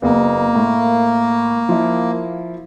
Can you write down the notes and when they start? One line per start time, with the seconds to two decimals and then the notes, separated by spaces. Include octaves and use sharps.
0.02 F#1 A#3 B3
0.55 A2
1.69 F3 E4